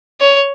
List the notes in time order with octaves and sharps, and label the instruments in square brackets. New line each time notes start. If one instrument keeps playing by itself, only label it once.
[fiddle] C#5